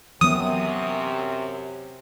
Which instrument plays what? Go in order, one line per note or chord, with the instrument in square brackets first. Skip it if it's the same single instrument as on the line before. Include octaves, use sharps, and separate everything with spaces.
[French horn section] F#2 C3 [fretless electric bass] E3 F#3 B3 [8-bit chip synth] D#6